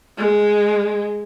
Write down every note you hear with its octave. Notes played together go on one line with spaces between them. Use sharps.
G#3